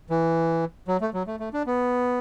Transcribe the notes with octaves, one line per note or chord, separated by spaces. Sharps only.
E3
F#3
A3
F#3
A3
A3
D4
B3